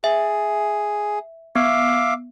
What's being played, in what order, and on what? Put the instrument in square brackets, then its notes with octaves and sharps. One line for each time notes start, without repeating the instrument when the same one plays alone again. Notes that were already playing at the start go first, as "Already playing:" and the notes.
[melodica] G#4 [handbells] E5
[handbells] B3 [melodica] E5 F5 D6